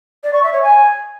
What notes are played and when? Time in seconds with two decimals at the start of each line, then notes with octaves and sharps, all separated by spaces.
0.24 D5
0.33 C#6
0.43 E5
0.53 C#5
0.63 G#5